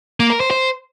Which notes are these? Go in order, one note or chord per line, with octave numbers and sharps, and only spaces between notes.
A#3
A#4
C5
C5